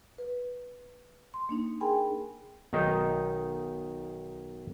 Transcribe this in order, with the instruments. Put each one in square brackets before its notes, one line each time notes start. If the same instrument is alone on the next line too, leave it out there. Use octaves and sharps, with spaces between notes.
[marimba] B4
C6
A#3 D4 D#4
G#4 A#4 G5 G#5 B5 C6
[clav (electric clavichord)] B1 D#3 D#4